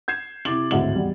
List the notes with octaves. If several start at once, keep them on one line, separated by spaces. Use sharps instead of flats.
G6 G#6 C7 E7
C3 E4 D6 A6 F#7
G#1 D2 A2 E5 F#7
E2 G3